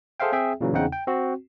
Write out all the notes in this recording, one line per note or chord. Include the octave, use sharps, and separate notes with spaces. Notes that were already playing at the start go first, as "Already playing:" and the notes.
G#4 A4 C5 E5 F5 G5
C4 G#4 E5 G5
A#2 C#3 E3 F#3
E2 C#3 C4 D#4 F#5 G5
G5
C4 F#4